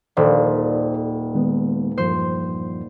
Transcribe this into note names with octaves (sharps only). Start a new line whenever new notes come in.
D#1 A4 C5 D5
D#3 G#3 B3
E2 G2 F3 C5